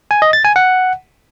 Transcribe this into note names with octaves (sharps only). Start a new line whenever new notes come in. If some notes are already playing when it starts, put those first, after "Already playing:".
G#5
D#5
A6
G#5
F#5